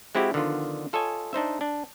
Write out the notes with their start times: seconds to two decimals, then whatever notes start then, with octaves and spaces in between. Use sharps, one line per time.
0.15 G#3 C4 E4 F#4 G4
0.34 D3 D#3 F3 B3 F4
0.93 F4 A4 C#5 D#5 G#5
1.33 D4 D#4 C5 E5
1.61 D4